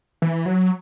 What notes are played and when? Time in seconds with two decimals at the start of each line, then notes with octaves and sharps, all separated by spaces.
0.22 E3
0.46 F#3